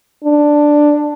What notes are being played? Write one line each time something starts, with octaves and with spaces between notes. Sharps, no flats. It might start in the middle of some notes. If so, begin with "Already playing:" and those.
D4